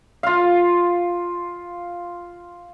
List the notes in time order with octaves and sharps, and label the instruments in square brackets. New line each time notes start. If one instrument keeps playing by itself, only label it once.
[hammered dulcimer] F4 F5